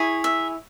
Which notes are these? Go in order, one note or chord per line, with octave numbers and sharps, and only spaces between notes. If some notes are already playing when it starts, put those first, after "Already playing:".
Already playing: E4 G#4 C#5
E5